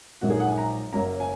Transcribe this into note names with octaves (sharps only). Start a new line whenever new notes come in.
A#1 G#2 F#3 A#3 F#4
G#4
F#5
G#5
A#5
F#1 F#2 F#3 A#3 C#4 A#5
G#5